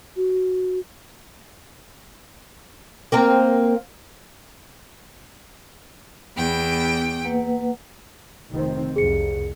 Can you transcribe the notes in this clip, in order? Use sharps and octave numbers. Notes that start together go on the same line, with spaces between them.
F#4
A#3 C4 A#4
E2 B3 G5
A#3 B4 F#5
F1 D#3 C4
C2 F2 G#4 C#7